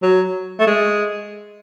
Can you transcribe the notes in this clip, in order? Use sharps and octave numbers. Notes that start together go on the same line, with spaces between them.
F#3
A3
G#3